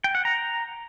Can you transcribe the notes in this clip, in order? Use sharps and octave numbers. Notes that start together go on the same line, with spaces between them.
G5
F#5
A#5